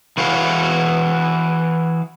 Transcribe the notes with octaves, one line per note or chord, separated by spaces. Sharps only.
E3 E4 F#4 G#4 F5